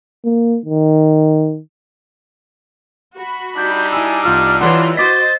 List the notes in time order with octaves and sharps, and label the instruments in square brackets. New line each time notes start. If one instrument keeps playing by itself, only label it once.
[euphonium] A#3
D#3
[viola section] F#4 B5
[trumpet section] G3 D4 D#4 [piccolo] G6
[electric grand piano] E4 E6 [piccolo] G#5
[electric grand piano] C2 F4 E6 [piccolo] F6
[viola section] E3 F4 [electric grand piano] C#5 D5 F#5 [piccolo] C6
[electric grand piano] F#4 D6 B6 [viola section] C5 D#5 [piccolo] A6